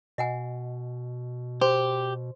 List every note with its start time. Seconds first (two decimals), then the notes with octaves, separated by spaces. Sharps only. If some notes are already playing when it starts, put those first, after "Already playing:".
0.18 B2 D#5 F#5 G#5
1.61 G4 C5 C6